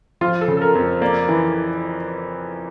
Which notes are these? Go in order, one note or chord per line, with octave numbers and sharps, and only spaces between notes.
F3 F4
A4
C#3
A4
A#4
F2
A#3 D5
E3